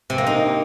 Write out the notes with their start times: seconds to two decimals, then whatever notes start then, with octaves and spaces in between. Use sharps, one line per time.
0.10 C3
0.18 A#3
0.27 D#4